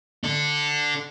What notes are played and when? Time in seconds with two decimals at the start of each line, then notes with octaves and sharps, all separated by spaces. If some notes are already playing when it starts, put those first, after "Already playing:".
0.24 D4 A4